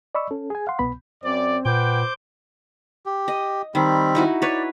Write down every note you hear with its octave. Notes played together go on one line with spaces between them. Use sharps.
D5 D#5 B5 C#6 E6
C#4 A4
G#4 G#5
F5 F#5 C6
C2 B2 B3 B5
F#2 C4 D5
A#2 B4 C5 F#5 G5 D6 G6
G4
D#5
D#3 G3 C4 B5
D#4 E4 F#4
B4 C#5 D5